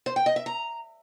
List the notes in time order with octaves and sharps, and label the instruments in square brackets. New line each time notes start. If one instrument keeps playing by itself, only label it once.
[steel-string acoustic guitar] C5
G5
D#5
E5
A#5